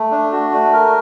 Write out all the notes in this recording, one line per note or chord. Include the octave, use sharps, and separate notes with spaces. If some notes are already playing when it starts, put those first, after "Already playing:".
Already playing: A3
D4
F#4
A3
A#4